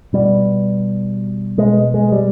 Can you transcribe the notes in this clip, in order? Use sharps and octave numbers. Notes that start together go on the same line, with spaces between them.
B2 G3
B2 G#3
G#3
G3